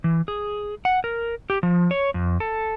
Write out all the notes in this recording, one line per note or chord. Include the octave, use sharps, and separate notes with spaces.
E3
G#4
F#5
A#4
G4
F3
C#5
F2
A4